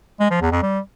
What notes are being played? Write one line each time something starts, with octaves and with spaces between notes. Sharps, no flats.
G#3
F3
E2
F2
G3